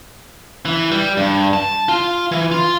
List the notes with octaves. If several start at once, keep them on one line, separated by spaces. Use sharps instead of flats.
E3
G3
G2
A5
F4
E3
F4